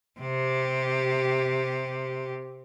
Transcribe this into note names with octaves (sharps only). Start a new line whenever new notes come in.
C3 G4